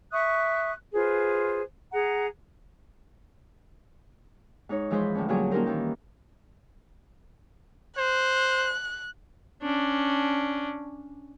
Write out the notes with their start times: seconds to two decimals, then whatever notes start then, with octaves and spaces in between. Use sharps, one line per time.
0.11 E5 C#6 D#6 F#6
0.93 F4 G#4 B4 C5
1.92 G#4 F#5 A#5
4.69 G#2 D#4 C#5
4.90 E3 F3 G#3 G#4 B4 C5
5.15 A2 D3 C#4
5.29 A#2 D3 F#3 G3 C#4 G#4
5.51 A#3 C#4 D#4 G4 A#4 C5
5.66 D#3 E3 G4
7.98 C5 F#6
9.62 C#4 D4